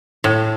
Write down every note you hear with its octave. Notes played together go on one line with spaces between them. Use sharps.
A2